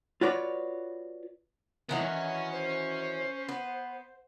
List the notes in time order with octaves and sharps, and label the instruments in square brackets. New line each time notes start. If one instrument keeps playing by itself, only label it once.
[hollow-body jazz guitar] F4 F#4 B4 C#5 D5
[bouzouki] D#3 E3 F#3 [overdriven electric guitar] B3 D#4
[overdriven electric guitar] C#4 C#5
[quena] C5
[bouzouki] B3